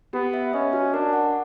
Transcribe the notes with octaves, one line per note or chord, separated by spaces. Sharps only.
B3 G4
E5
C#4 D#5
F#4
D4 A#4
F#5